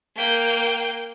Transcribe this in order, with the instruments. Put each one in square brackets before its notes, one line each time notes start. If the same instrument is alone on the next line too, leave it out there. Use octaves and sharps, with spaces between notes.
[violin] A#3 G5